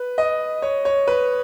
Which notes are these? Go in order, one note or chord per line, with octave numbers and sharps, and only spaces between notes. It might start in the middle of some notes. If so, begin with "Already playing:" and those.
Already playing: B4
D#5
C#5
C#5
B4